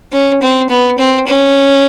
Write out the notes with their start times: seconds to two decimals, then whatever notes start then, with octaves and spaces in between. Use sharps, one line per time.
0.12 C#4
0.41 C4
0.69 B3
0.98 C4
1.27 C#4